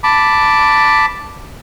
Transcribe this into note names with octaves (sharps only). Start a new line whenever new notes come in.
A5 B5 D6